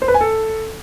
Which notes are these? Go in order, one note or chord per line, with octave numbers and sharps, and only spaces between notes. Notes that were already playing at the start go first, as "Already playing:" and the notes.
C5
B4
G#5
A4